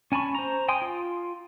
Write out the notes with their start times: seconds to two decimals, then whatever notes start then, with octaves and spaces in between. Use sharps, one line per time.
0.12 C#4 G#5 A5 B5 C#6
0.35 C5 A#5
0.68 G5 G#5 C6 D#6
0.82 F4